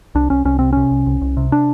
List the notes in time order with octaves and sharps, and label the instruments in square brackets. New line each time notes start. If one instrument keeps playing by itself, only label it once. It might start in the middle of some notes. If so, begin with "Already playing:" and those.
[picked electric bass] C2 D4
C2 C#4
C2 C#4
C3 C4
C3 C#4
C2
C2
C2
C3
D4